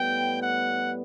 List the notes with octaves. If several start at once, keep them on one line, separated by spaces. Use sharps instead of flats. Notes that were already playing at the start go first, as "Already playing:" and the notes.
Already playing: A2 G3 B3 G5
F#5